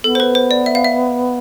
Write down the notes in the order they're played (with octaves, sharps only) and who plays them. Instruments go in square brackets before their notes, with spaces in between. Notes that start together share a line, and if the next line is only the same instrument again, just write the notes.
[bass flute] B3 [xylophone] A4
[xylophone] C5
B4
C5
D5
E5
F5
E5